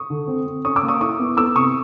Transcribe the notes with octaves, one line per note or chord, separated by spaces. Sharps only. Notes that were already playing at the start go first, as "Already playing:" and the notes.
Already playing: C#6 D#6
D3
C4
C4
C#4 C#6 D#6
D6 E6
A#3
C#6 D#6
E4 C#6 D#6
B3
B3 D6 E6
C3 C#6 D#6